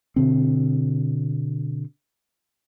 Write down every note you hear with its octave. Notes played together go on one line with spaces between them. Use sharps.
B2 D3 C4